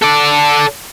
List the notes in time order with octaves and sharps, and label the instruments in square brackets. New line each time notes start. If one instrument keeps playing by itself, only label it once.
[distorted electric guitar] A4 D5